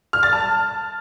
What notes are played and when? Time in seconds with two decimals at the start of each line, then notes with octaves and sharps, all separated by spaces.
0.13 F6
0.23 A6
0.33 A5